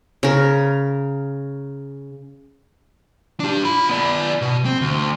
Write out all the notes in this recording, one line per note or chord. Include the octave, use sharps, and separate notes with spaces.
C#3 A#4
D4 G4
F4 B5
B3 D5
B2
C4
D2